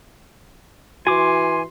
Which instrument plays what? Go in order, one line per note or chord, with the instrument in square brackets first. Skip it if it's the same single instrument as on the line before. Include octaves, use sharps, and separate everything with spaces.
[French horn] E3 [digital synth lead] F#4 [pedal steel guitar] G#5 D6 [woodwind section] C6